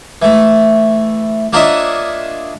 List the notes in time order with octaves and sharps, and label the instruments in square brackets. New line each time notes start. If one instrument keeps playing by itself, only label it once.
[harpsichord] E3 A3
A#3 D4 F4 C#5 D#5 E5